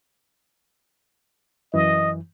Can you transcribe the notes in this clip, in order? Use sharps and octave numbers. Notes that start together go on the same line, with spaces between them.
F#2 E3 D#5